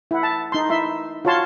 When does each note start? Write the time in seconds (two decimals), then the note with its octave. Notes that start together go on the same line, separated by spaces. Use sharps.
0.11 E4 F#5
0.23 A5
0.52 D#4 C6
0.70 E4 E5 C6
1.25 F4 F#4 C#5 F5 A5 C6